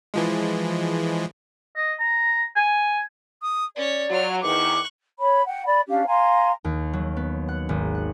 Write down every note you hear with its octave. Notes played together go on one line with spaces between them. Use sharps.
E3 F3 G#3
D#5
A#5
G#5
D#6
C#4 C#5 D5
F#3 F4 F6
E2 D#3 C#6 D6 F#6
C#5 B5
F#5 G5
D5 B5
C#4 D4 G4 F5
F5 G#5 A#5 C6
D#2
F#3
B3
F#5
G#1
F#5